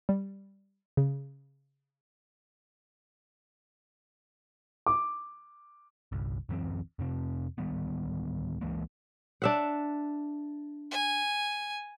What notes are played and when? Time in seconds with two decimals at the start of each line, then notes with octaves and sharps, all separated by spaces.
0.09 G3
0.97 C#3
4.86 D6
6.12 G1 C2
6.49 D1 F#2 E3 C4
6.99 F2 C3 C4
7.58 D1 D#3 G3 B3
8.61 C#2 E3 G#3 A#3
9.42 D4 E5 F#5
10.91 G#5